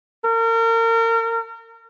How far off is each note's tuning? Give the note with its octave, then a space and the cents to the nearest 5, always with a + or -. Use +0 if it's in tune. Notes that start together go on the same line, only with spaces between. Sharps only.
A#4 -35